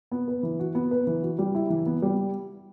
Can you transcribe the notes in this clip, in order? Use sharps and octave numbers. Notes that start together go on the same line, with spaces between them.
B3
B4
E3
F#4
B3
B4
E3
F#4
G3
E4
E3
B3
G3